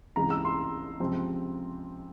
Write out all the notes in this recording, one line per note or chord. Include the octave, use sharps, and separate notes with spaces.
C#2 C3 E3 G#3 A#5
E6
C6
C#2 C3 F3 C4